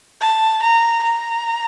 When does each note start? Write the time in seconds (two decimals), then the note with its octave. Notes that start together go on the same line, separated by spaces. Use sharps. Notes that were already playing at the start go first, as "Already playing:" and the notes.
0.21 A5
0.63 A#5
1.04 A#5